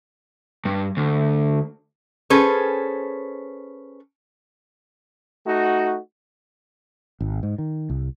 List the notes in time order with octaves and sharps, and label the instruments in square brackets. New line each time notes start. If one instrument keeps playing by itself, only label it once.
[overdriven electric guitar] G2
D2
[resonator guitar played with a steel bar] C#4 G#4 A4 B4 C5
[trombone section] A3 D#4 F#4
[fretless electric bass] G#1
G#2
D#3
C2